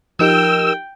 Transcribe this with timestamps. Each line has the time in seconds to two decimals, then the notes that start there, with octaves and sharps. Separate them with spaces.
0.19 F3 D#4 G4 A#4 G5 E6